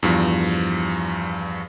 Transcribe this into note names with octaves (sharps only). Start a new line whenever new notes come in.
E2 G2 F3